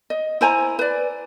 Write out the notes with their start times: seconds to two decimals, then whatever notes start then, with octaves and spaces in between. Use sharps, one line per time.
0.10 D#5
0.41 E4 C5 G#5 A#5
0.79 B4 D5